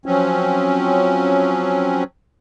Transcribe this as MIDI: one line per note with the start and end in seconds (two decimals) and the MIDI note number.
0.06 2.04 53
0.06 2.04 54
0.06 2.04 60
0.06 2.04 61